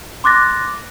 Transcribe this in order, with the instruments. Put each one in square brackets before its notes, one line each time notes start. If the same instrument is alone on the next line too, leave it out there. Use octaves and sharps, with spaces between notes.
[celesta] C6 D6 F#6 A6 A#6